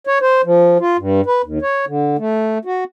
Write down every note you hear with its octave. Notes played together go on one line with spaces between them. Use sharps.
C#5
C5
F3
F4
G2
B4
D#2
C#5
D3
A3
F#4